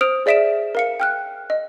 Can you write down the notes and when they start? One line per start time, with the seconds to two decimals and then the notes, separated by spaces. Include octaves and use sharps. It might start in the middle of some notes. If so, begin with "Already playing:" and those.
0.01 C5 D#6 F6 D7 F7
0.26 G#4 D5 E5 B6 D7 E7
0.75 A#4 F5 C#7
1.00 G5 F6 F#6
1.50 D#5